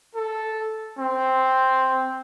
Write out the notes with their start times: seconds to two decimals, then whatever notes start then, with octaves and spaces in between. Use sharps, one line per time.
0.15 A4
0.97 C4